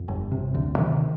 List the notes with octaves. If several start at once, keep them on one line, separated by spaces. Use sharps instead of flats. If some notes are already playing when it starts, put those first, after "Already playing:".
Already playing: F2
G1
C3
D2
C3 D#3